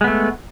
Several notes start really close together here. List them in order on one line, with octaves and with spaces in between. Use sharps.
G#3 B3 A3